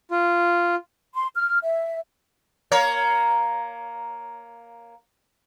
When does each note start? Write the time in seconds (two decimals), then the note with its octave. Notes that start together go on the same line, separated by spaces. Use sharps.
0.11 F4
1.14 C6
1.36 F6
1.63 E5
2.72 A#3 A#4 C#5